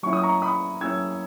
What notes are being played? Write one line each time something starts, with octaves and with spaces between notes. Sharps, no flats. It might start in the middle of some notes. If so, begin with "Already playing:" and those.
F#3 A#3 C#4 E4 C#6
D#6
A#5 C#6
B5 D#6
F#3 A#3 C#4 E4 E6 G#6